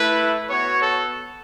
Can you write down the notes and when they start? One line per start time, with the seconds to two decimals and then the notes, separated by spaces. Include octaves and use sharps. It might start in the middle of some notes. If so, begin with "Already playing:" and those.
Already playing: A3 E4 B4
0.49 B3 F#4 C#5
0.82 A4